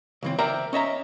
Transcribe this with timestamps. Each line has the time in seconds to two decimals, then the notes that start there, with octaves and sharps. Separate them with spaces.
0.23 C#2 E3 C4
0.39 A#4 C5 D5 E5 G5 A#5
0.73 C#4 D#5 E5 A#5